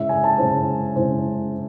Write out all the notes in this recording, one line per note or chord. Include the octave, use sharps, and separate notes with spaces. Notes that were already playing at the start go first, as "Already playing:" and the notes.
Already playing: C#3 G#3 C#4 E4 E5
G#5
A5
C#3 G#3 C#4 E4 C5
C#3 G#3 C#4 E4 C5